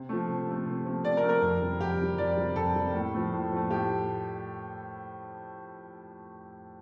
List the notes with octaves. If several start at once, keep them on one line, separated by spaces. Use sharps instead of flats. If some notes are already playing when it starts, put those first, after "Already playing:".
Already playing: C3
F3 A3
C3
F3 A3
C3
F3 A3
C3 D5
A#4
F3 A3
A#4
F2
C3 G3
F2 G4
C3 G3
F2 D5
C3 G3
F2 A4
C3 G3
A2
F3 A3
A2
F3 A3
A2 G4